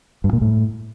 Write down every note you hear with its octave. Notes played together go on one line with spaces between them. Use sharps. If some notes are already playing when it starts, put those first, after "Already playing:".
G2
A#2
A2